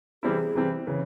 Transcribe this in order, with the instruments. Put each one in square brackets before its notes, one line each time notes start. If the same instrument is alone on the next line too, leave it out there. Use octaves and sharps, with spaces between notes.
[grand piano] C3 E3 G3 C4 E4 [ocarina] G#4
[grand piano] C3 E3 G3 C4 E4
[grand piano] C#3 E3 [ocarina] C#5